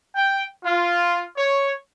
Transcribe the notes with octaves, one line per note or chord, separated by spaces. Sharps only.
G5
F4
C#5